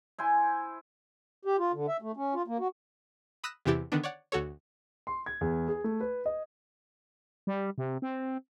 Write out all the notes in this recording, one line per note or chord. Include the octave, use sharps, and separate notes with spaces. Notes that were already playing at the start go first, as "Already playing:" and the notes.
E4 C5 G#5
G4
F4
D3
E5
A3
C#4
F4
A#3
F#4
B5 D#6 E6 F#6 A#6 E7
E2 C3 E3 E4 G4 A6
D3 D#3 B3 D4
C#5 D5 F#5
D2 F#4 A4 C#5
C6
G#6
E2
G#4
A3
B4
D#5
G3
C3
C4